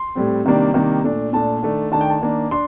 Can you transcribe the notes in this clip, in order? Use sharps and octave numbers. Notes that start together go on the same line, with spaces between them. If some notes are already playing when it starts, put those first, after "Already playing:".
Already playing: C6
A2 G3 C4
C3 D#3 G3 A#3 D4
C3 D#3 G3 A#3 D4
A#2 A3 D4
A#2 A3 D4 A5
D#3 A3 D4
D#3 A3 D4 A5
G5
A5
D#3 A#3 D4
D4 C6